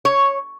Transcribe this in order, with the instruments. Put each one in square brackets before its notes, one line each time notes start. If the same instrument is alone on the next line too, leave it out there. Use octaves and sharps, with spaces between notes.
[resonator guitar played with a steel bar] C#5